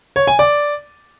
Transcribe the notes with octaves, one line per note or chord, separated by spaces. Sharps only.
C#5
G#5
D5